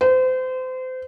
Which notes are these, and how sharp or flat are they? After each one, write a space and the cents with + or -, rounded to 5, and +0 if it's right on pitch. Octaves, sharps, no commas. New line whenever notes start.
C5 -30